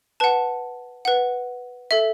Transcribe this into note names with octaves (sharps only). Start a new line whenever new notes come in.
B4 F#5 A5
B4 F#5
A4 E5